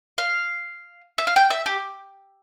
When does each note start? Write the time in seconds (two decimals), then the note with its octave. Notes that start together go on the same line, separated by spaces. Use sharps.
0.18 F5
1.18 E5
1.27 F5
1.36 G5
1.50 E5
1.66 G4